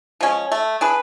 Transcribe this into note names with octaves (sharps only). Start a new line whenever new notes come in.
F3 G#3 C#4
A3
D4 G#4 B4